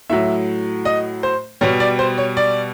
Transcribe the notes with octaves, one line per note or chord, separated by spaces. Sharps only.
A2 F#3 E5
D#5
C5
B2 G3 C#5
D5
C5
C#5
D5